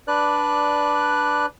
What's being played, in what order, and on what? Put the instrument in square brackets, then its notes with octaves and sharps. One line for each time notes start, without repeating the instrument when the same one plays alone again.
[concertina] D4 B4 D5 F#6